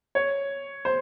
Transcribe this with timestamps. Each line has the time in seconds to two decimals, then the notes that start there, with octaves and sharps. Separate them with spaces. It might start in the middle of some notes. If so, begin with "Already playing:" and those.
0.15 C#5
0.85 C5